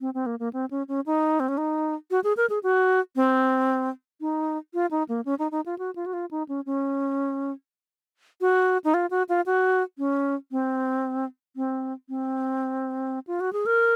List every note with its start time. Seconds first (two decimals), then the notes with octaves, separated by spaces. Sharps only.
0.01 C4
0.14 C4
0.26 A#3
0.39 A#3
0.53 C4
0.71 C#4
0.88 C#4
1.06 D#4
1.40 C4
1.48 C#4
1.58 D#4
2.11 F#4
2.24 G#4
2.37 A#4
2.50 G#4
2.63 F#4
3.16 C4
4.21 D#4
4.74 F4
4.91 D#4
5.09 A#3
5.25 C#4
5.39 D#4
5.52 D#4
5.66 F4
5.79 F#4
5.96 F4
6.06 F#4
6.13 F4
6.31 D#4
6.49 C#4
6.66 C#4
8.41 F#4
8.84 D#4
8.94 F4
9.11 F#4
9.29 F4
9.46 F#4
9.98 C#4
10.52 C4
11.56 C4
12.09 C4
13.27 F4
13.40 F#4
13.53 G#4
13.66 A#4